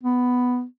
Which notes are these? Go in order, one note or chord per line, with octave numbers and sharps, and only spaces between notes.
B3